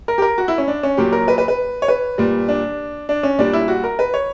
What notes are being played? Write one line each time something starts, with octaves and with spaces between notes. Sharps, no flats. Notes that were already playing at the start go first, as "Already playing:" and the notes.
A#4
G4
A#4
F#4
E4
C#4
D4
C#4
A#2 F#3 G4
A#4
B4
B4
B4
C#5
B4
A#2 G3
D4
D4
C#4
A#2 G3 D4
E4
F#4
A#4
B4
C#5